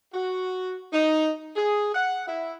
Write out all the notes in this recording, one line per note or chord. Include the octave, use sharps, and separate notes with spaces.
F#4
D#4
G#4
F#5
E4